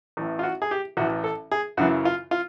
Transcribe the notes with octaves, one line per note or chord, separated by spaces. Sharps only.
A1 A2 E3
F4
F#4
G#4
G4
A1 A2 E3 F#4
A4
G#4
F#2 C#3 E3 F#4
F4
F4